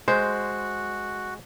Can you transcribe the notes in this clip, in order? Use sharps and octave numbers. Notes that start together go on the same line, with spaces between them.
G#3 F#4 C5